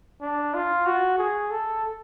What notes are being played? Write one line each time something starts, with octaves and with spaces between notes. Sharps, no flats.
D4
F4
F#4
G#4
A4